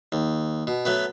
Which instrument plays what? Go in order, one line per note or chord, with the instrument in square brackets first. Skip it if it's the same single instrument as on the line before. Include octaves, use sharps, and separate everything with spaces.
[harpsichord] D#2
B2
F#3 A3 B3